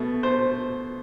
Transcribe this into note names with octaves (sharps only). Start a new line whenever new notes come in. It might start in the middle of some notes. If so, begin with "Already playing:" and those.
Already playing: B2 A3
C5